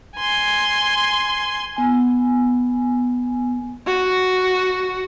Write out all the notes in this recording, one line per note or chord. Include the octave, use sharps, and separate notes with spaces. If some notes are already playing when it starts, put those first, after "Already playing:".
G#5 C6
B3 G#5
F#4